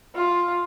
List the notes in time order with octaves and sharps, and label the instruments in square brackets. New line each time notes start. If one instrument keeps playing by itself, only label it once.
[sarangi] F4